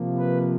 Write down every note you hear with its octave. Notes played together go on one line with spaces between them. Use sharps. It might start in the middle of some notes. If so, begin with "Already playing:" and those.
Already playing: C3 F3 A#3
B4